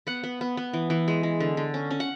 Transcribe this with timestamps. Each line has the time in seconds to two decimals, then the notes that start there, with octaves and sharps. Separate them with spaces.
0.07 B3 F#5
0.23 B3
0.41 B3
0.57 B3
0.73 E3
0.90 E3
1.08 G#3
1.23 G#3
1.40 D3
1.57 D3
1.74 C#4
1.91 C#4
2.00 F#5